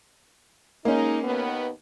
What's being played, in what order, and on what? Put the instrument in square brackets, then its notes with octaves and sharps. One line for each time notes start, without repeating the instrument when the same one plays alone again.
[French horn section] G#3 D#4 [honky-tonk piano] A#3 C#4
[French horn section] D#2 D#3 B3